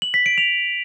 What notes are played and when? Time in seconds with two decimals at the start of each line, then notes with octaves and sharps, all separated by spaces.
0.02 F#7
0.14 B6
0.26 D7
0.38 F7